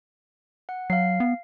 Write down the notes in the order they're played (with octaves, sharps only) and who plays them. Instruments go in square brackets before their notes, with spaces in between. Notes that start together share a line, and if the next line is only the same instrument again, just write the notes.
[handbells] F#5
[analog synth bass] F#3 [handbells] F5 C7
[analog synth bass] B3